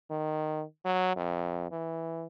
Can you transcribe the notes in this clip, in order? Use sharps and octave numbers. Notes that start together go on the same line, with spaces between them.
D#3
F#3
F2
E3